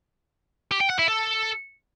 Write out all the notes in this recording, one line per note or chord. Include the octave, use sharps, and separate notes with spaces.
G4
G5
F#5
E4
A4